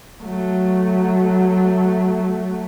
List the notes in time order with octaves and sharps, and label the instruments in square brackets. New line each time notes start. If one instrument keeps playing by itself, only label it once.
[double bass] F#3 A3